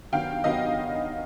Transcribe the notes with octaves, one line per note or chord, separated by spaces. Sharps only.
G2 D#3 F#3 B3 F5 G5
G2 D#3 F#3 B3 D#5 F5